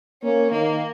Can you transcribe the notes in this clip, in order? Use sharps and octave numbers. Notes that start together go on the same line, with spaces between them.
A#3 C#4
D#3 A#3